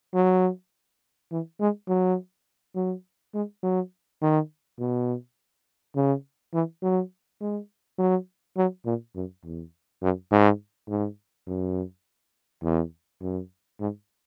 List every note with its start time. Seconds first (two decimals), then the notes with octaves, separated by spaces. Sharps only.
0.14 F#3
1.31 E3
1.60 G#3
1.88 F#3
2.75 F#3
3.34 G#3
3.63 F#3
4.22 D#3
4.79 B2
5.96 C#3
6.53 E3
6.82 F#3
7.41 G#3
7.98 F#3
8.57 F#3
8.85 A#2
9.15 F#2
9.44 E2
10.02 F#2
10.31 G#2
10.88 G#2
11.47 F#2
12.63 E2
13.21 F#2
13.80 G#2